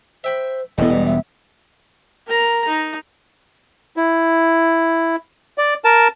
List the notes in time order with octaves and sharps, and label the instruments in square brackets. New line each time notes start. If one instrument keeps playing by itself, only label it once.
[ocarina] C5 [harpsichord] E5 G5 B5
[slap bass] E1 B3 [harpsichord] E2 A2 [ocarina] D#5
[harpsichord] G2
[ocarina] E5
[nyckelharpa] A#4 A#5
D#4
[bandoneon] E4
D5
A#4 A5